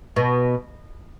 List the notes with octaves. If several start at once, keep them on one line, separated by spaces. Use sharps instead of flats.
B2